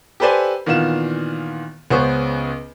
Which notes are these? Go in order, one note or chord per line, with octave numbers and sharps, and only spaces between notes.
G4 A4 B4 C5 D5 G#5
A#2 D#3 E3 B3 F5 E7
C#2 B3 C#4 G#4 C5 C#6